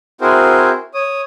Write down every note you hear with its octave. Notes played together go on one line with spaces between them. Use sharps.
C4 E4 F#4 G#4 A#4 C5
C#5 D#6